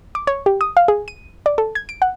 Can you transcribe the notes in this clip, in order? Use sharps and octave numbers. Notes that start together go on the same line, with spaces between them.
D6
C#5
G4
D#6
F5
G#4
D#7
D5
A4
G#6
D7
F#5